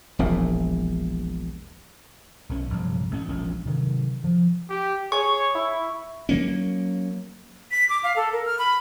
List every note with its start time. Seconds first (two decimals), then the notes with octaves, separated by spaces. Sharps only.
0.19 E1 A#1 A#2
2.49 B1 C#4
2.70 A#1 G2 C3 F#3
3.11 A1 A3 C#4
3.28 E1 A#1 C#4 D4
3.65 C3 D#3 F#3
4.24 F3
4.69 G4
5.12 G#4 C#5 C#6
5.55 E4
6.29 F#3 A#3 C#4
7.71 B6
7.89 D6
8.04 F5
8.16 A4
8.32 A#4
8.46 F6
8.59 B5